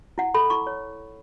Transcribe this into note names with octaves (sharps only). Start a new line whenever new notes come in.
E4 F#5
A4 B5
E4 C#6
C#5